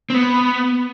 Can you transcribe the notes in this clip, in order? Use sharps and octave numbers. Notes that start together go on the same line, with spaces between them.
C4
B3